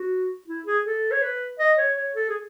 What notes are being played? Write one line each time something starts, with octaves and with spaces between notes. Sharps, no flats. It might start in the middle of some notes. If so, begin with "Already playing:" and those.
Already playing: F#4
E4
G#4
A4
C#5
B4
D#5
C#5
C#5
A4
G#4